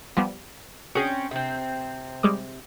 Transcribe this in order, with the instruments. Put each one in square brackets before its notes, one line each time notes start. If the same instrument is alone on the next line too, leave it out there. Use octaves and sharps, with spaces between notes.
[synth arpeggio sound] F3 G3 B3
[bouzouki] C4 C#4 [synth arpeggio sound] F#4 G#4
[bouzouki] C3 C4
[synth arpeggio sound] G3 G#3 D6